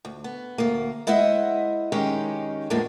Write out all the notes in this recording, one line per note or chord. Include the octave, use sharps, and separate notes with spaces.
D2
B3
D2 A#3
G#3 E4 C5 D#5 E5 F#5
D#3 G#3 C#4 D#4 G4
E2 A2 F3 G#3 A#3 D4